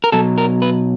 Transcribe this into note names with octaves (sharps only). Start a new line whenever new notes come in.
A#4
B2 F#3 A4
A#4
B4